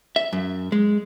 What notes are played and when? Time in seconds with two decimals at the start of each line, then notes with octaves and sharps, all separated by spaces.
0.16 E5
0.33 F#2
0.72 G#3